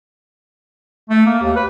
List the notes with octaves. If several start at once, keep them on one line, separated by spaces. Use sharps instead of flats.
A3
A#3
D#2
B4